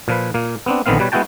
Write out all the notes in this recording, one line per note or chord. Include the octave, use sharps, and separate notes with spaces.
A#2 F3 B4
A#2 A#3
B3 C4 D4
A#1 D3 D#3 B3 C4 F5
B2 G3 B4 C#5
G#3 B3 E4 F#4 G5 A5